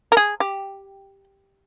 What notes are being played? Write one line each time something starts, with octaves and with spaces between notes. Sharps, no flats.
A#4
G#4
G4